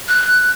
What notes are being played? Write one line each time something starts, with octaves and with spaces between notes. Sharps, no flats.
F#6